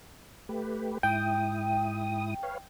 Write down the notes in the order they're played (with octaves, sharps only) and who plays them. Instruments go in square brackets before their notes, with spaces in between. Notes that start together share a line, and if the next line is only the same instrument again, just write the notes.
[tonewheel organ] A3 G4 B4
[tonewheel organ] G#2 E4 D#6 [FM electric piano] G5
[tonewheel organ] B4 C#5 F5